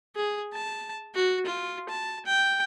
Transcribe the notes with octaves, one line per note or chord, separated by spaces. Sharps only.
G#4
A5
F#4
F4
A5
G5